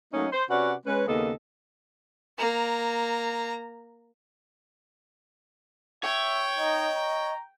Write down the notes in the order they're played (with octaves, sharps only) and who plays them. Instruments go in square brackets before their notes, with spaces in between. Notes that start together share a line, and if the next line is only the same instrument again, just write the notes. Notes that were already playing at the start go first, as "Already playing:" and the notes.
[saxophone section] F#3 A3 A#3 C#4 D#4
C5
C3 C#4 F#4 B4 D5 F#5
G#3 C#4 B4
D#2 C#3 A#3 B3 A4 D#5
[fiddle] A#3 A#5
[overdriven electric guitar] C#5 [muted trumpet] E5 [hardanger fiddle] G5
[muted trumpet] D#4 [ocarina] D#5
[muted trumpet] A#5